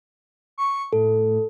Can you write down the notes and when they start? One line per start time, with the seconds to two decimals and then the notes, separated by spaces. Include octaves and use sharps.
0.58 C#6
0.93 A2 A4